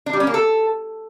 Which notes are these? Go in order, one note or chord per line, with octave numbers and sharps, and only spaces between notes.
D4
G3
C#4
A#3
A4